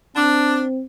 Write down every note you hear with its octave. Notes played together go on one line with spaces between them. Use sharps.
C4 D4